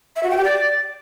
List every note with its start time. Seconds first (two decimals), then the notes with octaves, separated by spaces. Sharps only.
0.16 E5
0.23 F#4
0.30 G5
0.37 G4
0.44 D5